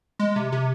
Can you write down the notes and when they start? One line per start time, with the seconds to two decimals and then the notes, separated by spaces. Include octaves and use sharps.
0.19 G#3
0.36 C3
0.52 C3